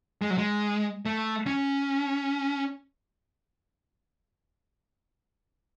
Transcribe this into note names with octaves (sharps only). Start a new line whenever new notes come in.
G#3
F#3
G#3
A3
C#4